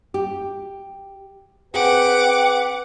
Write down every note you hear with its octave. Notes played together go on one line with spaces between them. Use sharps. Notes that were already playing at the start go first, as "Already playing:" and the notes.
G4
C4 G#4 B4 F#5 G5 D6